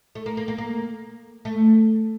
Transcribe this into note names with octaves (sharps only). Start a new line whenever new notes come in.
A3
A#3
A#3
A#3
A#3
A3